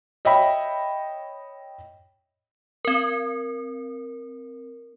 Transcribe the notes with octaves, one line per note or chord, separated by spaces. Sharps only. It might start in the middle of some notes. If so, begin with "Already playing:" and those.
C#5 D#5 E5 G5 B5
C4 A#4